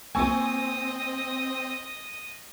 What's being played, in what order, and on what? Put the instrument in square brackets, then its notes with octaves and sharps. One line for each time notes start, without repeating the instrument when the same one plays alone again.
[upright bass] A#3 F4 [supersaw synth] C4 [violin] D#5 D#6 [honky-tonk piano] G#5 C#6 E6